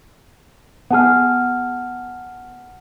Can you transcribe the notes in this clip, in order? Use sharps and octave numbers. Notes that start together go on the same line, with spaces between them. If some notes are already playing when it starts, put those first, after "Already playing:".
B3 G#4 F#5 A5 F6